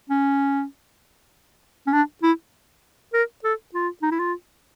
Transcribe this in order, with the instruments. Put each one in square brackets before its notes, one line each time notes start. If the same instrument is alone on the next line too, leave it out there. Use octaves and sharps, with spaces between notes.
[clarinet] C#4
C#4
D4
E4
A#4
A4
F4
D#4
E4
F4